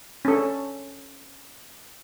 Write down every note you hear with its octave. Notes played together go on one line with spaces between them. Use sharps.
C#4 A4